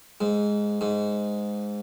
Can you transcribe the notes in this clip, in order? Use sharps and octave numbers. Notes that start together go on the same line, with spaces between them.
G#2
G#2